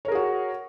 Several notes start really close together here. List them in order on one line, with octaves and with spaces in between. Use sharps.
C#5 A#4 G#4 F#4